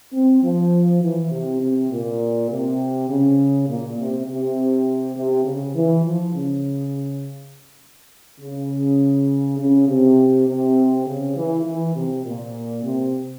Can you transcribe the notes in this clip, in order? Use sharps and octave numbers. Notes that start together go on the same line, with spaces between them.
C4
F3
E3
C3
C3
A#2
C3
C#3
A#2
C3
C3
C3
C#3
E3
F3
C#3
C#3
C#3
C3
C3
C#3
E3
E3
C3
A#2
C3